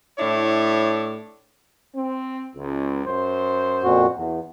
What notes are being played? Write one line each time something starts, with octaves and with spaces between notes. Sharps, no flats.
A2 D4 E4 C#5
C4
C#2
F#2 C5
F2 A#2 F#4
E2